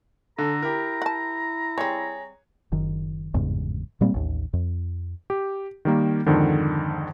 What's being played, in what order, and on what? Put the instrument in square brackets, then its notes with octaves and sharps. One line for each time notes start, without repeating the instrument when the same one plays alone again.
[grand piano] D3 [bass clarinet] A4 [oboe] A#5
[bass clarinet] E4 [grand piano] G4 A#4
[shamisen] F#5 A5
[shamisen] G3 C4 [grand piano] G#4 C#5
[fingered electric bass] F#1 D#3
G1 E2 G#2 C#3
A#2 G3 A#3 C4
A1 D#2
F2
[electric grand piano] G4
D#3 G3 A#3
F2 G#2 D3 D#3